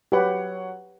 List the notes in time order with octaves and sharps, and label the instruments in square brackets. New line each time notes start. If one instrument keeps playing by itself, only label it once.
[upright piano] F#3 C#5 F#5 [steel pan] G4 B4